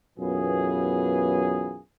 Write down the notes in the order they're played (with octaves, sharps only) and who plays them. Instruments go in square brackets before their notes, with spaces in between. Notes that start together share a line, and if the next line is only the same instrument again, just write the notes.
[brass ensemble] B1 F#2 E3 B3 F4 G#4